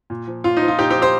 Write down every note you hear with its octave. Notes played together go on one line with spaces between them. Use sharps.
A#2
F3
A#2 F4
D#4
F3
F4
A#2 D#4 G4
G4 C5
F3
G4 C5